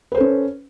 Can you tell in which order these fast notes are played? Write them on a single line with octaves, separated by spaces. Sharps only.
B4 C5 A4 C#4